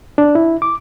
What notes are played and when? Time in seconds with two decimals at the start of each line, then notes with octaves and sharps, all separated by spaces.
0.18 D4
0.35 E4
0.62 D6